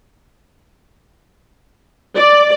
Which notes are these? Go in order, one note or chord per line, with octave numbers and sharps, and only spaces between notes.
D5